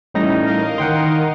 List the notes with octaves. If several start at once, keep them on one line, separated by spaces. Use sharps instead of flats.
A2 E3 G3 C#4 D#4 A#6
A#4 D#5 F5
D#3 F#5 G5 C6